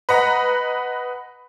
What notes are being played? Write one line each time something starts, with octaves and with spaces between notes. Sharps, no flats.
B4 D#5 F#5 A#5 B5